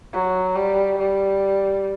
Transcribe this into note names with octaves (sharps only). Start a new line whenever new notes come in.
F#3
G3
G3